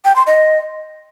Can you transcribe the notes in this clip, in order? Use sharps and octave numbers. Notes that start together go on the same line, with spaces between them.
G5
C6
D#5